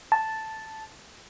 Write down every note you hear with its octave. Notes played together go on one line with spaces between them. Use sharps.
A5